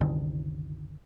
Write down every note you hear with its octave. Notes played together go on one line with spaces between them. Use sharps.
F#1 C2 D3 D#3